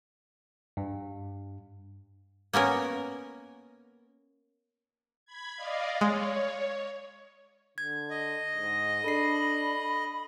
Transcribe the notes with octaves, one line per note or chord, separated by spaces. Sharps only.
G2
A#3 B3 C#4 A#4
B5 G#6
D5 D#5 F5
G#3 C#5
D3 G#6
D#5
G#2
D4 A4 B5 C7